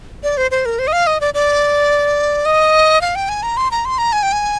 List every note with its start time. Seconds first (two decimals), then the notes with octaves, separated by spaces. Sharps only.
0.23 D5
0.37 C5
0.51 C5
0.65 A#4
0.79 C5
0.87 D#5
0.93 F5
1.07 D#5
1.21 D5
1.34 D5
2.45 D#5
3.01 F5
3.15 G5
3.29 G#5
3.43 A#5
3.57 C6
3.71 A#5
3.85 C6
3.98 A#5
4.13 G#5
4.23 G5
4.32 G#5